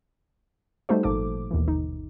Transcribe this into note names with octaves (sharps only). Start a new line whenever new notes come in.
G3 A3 D#4 F#4 C5
G#1 A#2 F3 D#4 A4 D6
D#2 B2 E3
G1 D#4